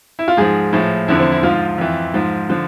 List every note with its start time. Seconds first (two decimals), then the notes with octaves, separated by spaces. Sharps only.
0.19 E4
0.28 F4
0.37 G#2 F3 G#4
0.73 A2 F3
1.08 E2 D3 F3 E4
1.19 C4
1.32 E4
1.43 G#2 F3 F4
1.78 F2 E3
2.14 G#2 F3
2.49 D3 F3